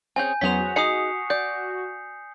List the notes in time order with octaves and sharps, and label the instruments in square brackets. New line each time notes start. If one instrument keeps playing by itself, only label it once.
[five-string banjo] C4 C#4 G#4 [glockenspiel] G#5 G6
[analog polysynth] E2 F#3 B3 [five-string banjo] C#4 G#4 C5 [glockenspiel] B6 F7
[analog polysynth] F#4
[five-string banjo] D#4 G#4 D#5 [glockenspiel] D#6 C7 C#7
[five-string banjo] D5 [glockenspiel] G6